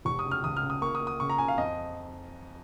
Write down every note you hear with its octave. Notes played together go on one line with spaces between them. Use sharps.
F1 C#6
D#6
C#3
F6
C#2 D#6
F6
C#3
D#6
A#3 C#6
D#6
A#3
D#6
C#3 C#6
A#5
C#3 G#5
F5
F2 D#5